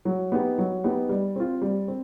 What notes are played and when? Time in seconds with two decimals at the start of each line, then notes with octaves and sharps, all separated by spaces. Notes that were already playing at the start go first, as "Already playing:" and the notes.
0.05 F#3
0.32 B3 D#4 G4
0.58 F#3
0.84 B3 D#4 G4
1.09 G3
1.36 C4 F4
1.62 G3
1.88 C4